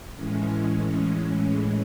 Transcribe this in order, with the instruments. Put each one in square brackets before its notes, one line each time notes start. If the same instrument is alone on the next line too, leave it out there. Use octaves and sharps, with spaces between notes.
[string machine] A2 E3 G#3 C#4